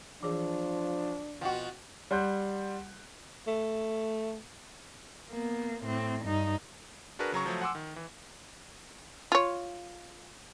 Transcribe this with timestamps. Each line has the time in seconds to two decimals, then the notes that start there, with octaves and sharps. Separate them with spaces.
0.23 E3 F3 D4 G#4 C#5
1.41 B2 F3 F#4 F#5 G5
2.11 G3 F#5 C6 F#6 G6
3.47 A3
5.31 A#3 B3
5.84 A2 C4
6.24 G2 D#4
7.19 D4 F#4 G#4 A#4 B4
7.32 C#3 F#3 A#5 C#6
7.46 F3 F#3 A3
7.62 F#5 G#5 C6 D6 E6
7.75 D#3
7.96 E3
9.32 F4 C#5